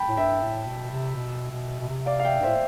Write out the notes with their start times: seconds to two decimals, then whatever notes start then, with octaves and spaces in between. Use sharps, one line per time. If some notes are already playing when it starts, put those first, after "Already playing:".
Already playing: G5 A5 B5
0.09 A2
0.17 G2 E5 G5
0.42 A2
0.67 B2
0.90 C3
1.16 B2
1.51 B2
1.79 B2
1.89 C3
2.06 D5 F5
2.20 F5
2.25 E5 G5
2.39 G2
2.43 A2 C5 E5